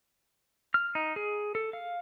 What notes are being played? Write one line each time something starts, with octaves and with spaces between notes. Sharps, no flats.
F6
D#4
G#4
A4
F5